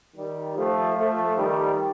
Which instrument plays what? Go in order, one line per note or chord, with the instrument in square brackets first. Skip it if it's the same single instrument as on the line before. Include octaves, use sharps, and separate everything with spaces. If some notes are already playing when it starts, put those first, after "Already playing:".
[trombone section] D#3 G3
F3 A3
F3 A3
D#3 G3